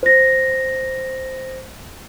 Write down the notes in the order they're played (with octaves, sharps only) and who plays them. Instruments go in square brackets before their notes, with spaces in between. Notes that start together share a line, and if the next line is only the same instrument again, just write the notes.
[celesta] C5 A#6